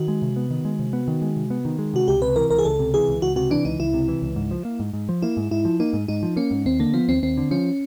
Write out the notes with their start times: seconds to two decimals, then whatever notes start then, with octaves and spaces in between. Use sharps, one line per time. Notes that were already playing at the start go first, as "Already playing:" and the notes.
Already playing: D#3 F#4
0.08 G#3
0.22 C3
0.36 B3
0.51 D#3
0.65 G#3
0.79 C3
0.93 B3
1.08 D#3
1.22 G#3
1.36 C3
1.50 B3
1.65 D#3
1.79 G#3
1.94 C3 F#4
2.08 C#2 G4
2.22 C3 B4
2.36 E3 A#4
2.50 C#2 A#4
2.59 G#4
2.65 C#2 A4
2.79 C3
2.94 E3 G#4
3.09 C#2
3.22 C#2 F#4
3.36 C3 F#4
3.50 E3 D4
3.65 C#2 D#4
3.79 C#2 E4
3.94 C3
4.08 E3
4.22 C#2
4.36 G#2
4.51 F3
4.65 A#3
4.80 G#2
4.93 G#2
5.09 F3
5.22 A#3 E4
5.37 G#2
5.51 G#2 E4
5.65 F3
5.80 A#3 D#4
5.93 G#2
6.08 G#2 D#4
6.23 F3
6.36 A#3 C#4
6.51 G#2
6.66 D#2 C4
6.80 D3 A#3
6.94 F3 B3
7.08 D#2 C4
7.23 D#2 C4
7.37 D3
7.51 F3 C#4